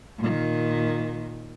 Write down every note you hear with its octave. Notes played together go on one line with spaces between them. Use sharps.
A#2 D#3